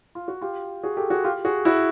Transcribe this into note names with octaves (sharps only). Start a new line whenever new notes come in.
F4
F#4
F4 G4
F#4 G#4
G4 A4
F#4 G#4
F4 G4
F#4 G#4
E4 F#4